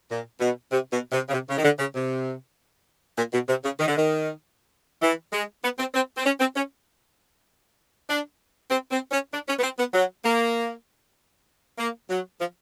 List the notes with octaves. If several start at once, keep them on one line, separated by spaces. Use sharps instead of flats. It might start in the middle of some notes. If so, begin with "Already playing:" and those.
A#2
B2
C3
B2
C3
C#3
C3
C#3
D#3
D3
C#3
C3
A#2
B2
C3
C#3
D#3
D3
D#3
E3
G#3
B3
C4
C4
C4
C#4
C4
C#4
D4
C4
C4
C#4
D4
C#4
B3
C4
B3
F#3
A#3
A#3
F#3
F3